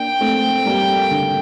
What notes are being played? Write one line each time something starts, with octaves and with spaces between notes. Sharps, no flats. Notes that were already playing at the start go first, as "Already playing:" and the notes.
Already playing: A#3 D4 G5
A3 C4
G3 A#3
D3